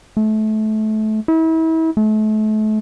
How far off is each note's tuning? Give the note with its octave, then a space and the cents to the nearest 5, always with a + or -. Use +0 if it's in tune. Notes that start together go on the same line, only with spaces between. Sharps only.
A3 -25
E4 -35
A3 -35